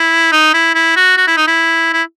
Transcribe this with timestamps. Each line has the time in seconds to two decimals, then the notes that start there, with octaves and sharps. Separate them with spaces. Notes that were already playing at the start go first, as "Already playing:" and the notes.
Already playing: E4
0.32 D#4
0.54 E4
0.75 E4
0.96 F#4
1.17 F#4
1.27 E4
1.37 D#4
1.47 E4
1.93 E4